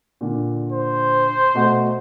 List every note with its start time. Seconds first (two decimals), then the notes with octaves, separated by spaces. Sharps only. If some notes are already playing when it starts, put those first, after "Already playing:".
0.21 A#2 D3
0.72 C5
1.54 B2 A3 F#4